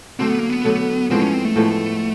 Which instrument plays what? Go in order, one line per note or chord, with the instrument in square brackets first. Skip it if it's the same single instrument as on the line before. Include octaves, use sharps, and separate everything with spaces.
[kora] D3 F#3 A3 [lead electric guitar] C4
[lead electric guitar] B3
A#3
B3
[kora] D3 F#3 A3
[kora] A2 F3 G#3 B3 [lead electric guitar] C4
[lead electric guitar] C#4
C4
A3
[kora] A2 F3 G#3 B3